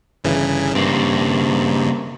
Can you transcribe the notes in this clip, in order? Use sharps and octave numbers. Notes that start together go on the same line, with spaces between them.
G1 C#3 E3
G2 C#3 A#3 C4